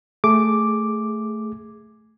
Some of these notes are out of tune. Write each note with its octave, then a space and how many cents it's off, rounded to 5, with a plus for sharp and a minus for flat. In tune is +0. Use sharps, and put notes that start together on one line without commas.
A3 +0 G#4 +0 D6 +0